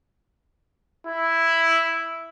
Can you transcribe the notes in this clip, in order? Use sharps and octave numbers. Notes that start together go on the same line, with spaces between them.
E4